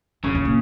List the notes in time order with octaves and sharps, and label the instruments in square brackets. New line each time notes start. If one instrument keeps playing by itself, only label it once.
[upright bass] F#2 [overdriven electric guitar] C#3
[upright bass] F#2
A#2